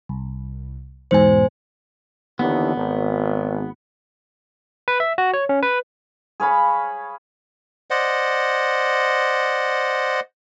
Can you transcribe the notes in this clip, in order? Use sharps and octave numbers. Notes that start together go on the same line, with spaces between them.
C2
E2 G#2 B2 C5 G#5
D#2 D3 E3 B3
G#1
B4
E5
F#4
C#5
C#4
B4
G#4 C#5 F5 B5
C5 D5 D#5 F#5